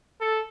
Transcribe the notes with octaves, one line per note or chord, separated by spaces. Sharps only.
A4